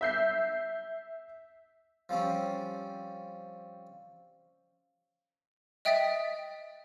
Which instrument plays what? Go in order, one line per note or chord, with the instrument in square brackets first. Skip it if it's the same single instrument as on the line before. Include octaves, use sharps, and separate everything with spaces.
[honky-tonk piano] E5 G6 C7
[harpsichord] F3 G3 C4 C#4
[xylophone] D#5 E5 G5 D#6 A6 B6